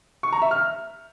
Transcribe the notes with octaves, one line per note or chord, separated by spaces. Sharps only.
C#6
A#5
E5
F6